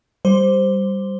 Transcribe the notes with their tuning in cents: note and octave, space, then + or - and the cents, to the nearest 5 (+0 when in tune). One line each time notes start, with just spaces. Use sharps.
G3 +0 C5 +0